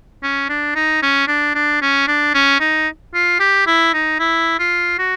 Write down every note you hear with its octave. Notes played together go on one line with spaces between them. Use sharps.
C#4
D4
D#4
C#4
D4
D4
C#4
D4
C#4
D#4
F4
G4
E4
D#4
E4
F4
F#4